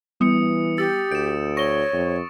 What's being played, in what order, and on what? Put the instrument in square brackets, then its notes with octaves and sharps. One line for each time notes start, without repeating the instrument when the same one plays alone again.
[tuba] E3 [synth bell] G3 B3 [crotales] D#6 C#7
[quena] G4 [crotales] E6 A6
[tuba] D2 [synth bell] G6 [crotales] D7 E7
[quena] C#5 [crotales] C#6 [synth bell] A#6 G7
[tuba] F2